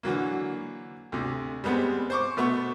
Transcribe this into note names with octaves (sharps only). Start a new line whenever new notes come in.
D3 E3 F#3 A#3
D2 C3
G3 G#3 B3 C4
C5 C#6 D6
B2 A3 B3 C#6